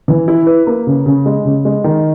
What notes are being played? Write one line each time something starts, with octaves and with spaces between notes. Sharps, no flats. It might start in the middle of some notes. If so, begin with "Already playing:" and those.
E3
E4
B4
A#3
C#3
C#3
G#3
C#3
G#3
D#3